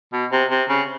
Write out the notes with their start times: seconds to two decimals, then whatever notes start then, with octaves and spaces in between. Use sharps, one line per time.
0.13 B2
0.32 C3
0.50 C3
0.69 C#3